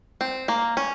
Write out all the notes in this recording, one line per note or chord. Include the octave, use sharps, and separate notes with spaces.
C4
A#3
C#4